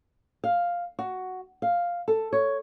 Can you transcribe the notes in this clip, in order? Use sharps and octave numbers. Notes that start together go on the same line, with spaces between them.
F5
F#4
F5
A4
C#5